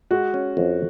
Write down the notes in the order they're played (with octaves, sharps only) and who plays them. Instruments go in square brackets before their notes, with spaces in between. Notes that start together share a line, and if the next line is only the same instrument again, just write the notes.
[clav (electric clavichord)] G#3 [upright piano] F#4
[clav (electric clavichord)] C#4
F2